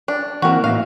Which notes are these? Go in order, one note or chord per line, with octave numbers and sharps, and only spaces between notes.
D4
E3 A#3 C4 F#4 A#4
A2 D#4 E5 F5